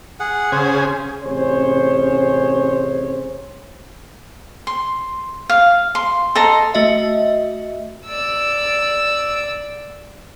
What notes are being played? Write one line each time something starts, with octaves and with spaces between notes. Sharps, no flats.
G#4 F#5
C#3 G#4 C5
A1 C3 C#4 G#4 C5 C#5
C6
F5
C6
A4 D#5 A#5 C6
A3 F#4 D#5 E5
D5 E6